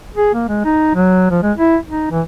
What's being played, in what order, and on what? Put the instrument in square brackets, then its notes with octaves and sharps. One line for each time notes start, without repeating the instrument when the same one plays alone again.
[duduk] G#4
A#3
G#3
D#4
F#3
F3
G#3
E4
D#4
E3